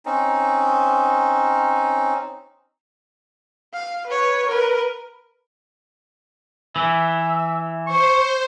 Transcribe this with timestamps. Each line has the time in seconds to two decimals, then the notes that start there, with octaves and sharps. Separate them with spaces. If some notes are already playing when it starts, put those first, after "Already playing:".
0.06 C4 C#4 D#4
3.74 F5
4.07 B4 C#5
4.48 A#4 B4
6.76 E3 E5
7.87 C5 C#6